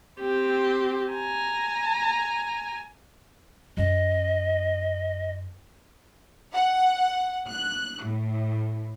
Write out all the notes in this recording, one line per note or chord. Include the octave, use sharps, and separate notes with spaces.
C4 G4
G#5 A#5
F#2 C#4 D#5
F#5
F#6
A2